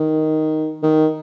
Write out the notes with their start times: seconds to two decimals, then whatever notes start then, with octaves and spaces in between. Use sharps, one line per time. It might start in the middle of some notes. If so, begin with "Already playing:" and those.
Already playing: D#3
0.83 D#3